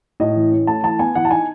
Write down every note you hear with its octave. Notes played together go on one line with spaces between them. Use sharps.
A2 D#5
E3
C#4
A3 A5
E3 A5
B3 G#5
E3 F#5
A5
D#4 G#5